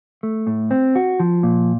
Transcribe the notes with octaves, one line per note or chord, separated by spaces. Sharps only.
A3
A2
C4
F#4
F3
A#2